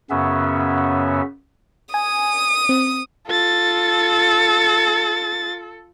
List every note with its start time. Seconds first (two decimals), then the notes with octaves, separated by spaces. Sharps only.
0.10 F#2 C#3 B3 C#4 E5
1.94 G#5 D#6
2.69 C4
3.28 F4 A4 A6